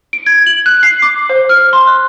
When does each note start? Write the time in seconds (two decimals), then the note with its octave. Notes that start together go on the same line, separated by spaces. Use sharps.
0.13 D7
0.26 G#6
0.46 F#7
0.66 F#6
0.83 C7
1.02 D6
1.30 C5
1.49 F6
1.73 C6
1.87 F#6